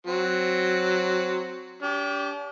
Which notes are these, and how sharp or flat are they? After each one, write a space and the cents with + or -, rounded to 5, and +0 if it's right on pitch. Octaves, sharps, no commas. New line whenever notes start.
F#3 +0 C4 +0
D4 -45 G4 +0